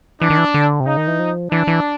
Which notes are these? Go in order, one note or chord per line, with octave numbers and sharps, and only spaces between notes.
E3 D4
D#3
E3
D3
C3
C#3 D#4
D#3
E3
F3
E3 D4
E3